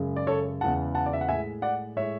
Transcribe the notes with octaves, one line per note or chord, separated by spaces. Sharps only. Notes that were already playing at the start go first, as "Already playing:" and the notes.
Already playing: F#2 C#3 G#3
D5
A4 C#5
E2 C#3 E3 G#3 F#5 A5
F#5 A5
D5
E5
F#5
A2 G#3 E5 G#5
D5 F#5
A2 G#3 C#5 E5